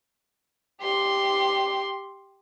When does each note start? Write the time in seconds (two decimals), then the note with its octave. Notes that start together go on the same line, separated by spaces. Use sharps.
0.81 G4 C6